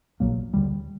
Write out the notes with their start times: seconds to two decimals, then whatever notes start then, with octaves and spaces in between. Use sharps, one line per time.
0.20 A#1 A#2 F#3 A#3
0.54 D#2 D3 G3